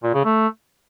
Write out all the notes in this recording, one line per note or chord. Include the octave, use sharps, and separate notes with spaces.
A#2
C#3
A3